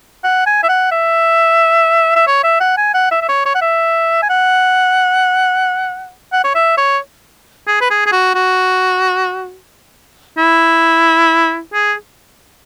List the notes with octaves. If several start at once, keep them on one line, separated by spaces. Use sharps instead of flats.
F#5
G#5
E5
F#5
E5
E5
C#5
E5
F#5
G#5
F#5
E5
E5
C#5
C#5
F#5
E5
G#5
F#5
F#5
C#5
E5
C#5
G#4
B4
G#4
G#4
F#4
F#4
E4
G#4